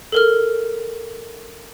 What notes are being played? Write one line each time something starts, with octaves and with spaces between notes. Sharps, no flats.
A4 A#4 F6